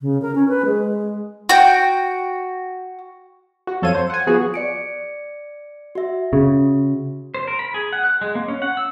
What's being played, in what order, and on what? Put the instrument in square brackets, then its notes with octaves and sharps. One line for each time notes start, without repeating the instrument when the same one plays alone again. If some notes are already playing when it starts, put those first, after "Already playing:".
[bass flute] C#3
A#4
C#4
B4
G#3
[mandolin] F#4 G5
[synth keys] F#4
F2 F3 A4 C#5 F5 D#7
C5
F#5 G#5
F3 B3 F#4 G#4
[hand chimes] D5 C#7 D7
F#4 E5
[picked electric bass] C#3
[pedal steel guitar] C5
A#4
B5
G#4
F#5
F#6
G#3
A#3
C#4
F#5
E6